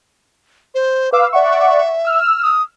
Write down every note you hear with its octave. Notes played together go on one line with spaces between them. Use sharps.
C5
B4 F5 D6 E6
D5 E5 F#5 C#6
E6 F6
D#6